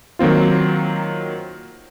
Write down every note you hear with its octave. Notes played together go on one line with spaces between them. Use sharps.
D#3 F#3 A#3 C4 F4